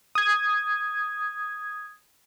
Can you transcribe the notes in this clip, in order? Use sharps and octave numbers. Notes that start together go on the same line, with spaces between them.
D#6 G#6